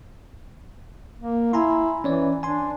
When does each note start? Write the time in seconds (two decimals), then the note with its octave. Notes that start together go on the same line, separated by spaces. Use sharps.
1.19 A#3
1.53 E4 G#5 A#5 C6
2.04 E3 C#4 C#5 D5
2.43 D4 G#5 C6